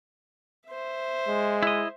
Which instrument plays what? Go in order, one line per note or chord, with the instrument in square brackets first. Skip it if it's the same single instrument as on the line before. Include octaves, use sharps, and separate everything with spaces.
[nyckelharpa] C5 E5
[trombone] G#3
[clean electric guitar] E4 D#5